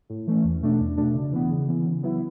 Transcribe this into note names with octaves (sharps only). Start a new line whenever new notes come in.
A2
E3 A3 C#4
E2
B2 A3 D4
E2
B2 A3 D4
C#3
E3 B3
C#3
E3 B3
C#3
F#3 B3 E4